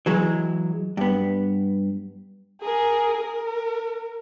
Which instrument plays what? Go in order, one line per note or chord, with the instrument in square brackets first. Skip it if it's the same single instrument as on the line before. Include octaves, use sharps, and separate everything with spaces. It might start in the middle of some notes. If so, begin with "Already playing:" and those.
[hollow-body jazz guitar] E3 F#3 G#3
G2 B3
[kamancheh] G#4 A#4
A#4